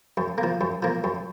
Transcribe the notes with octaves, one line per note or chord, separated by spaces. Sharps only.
F#2
A#3
F3
F#2
F3 A#3
F#2